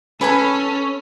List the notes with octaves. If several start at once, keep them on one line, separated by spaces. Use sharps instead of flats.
C#4 A4 B4 G#5 B5